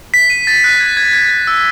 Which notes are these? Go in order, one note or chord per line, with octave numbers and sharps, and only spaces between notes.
B6
D#7
A6
F#6
G#6
G#6
G#6
G#6
E6